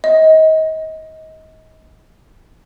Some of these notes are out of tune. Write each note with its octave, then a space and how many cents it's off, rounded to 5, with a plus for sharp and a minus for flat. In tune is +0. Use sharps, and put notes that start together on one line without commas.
D#5 +30